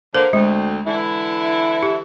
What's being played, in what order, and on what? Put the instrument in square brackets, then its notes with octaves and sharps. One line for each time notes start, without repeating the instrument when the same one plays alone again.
[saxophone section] D3 A#3 [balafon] C5
[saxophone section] D2 C4 [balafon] G#3
[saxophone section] D3 E3 E4
[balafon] G4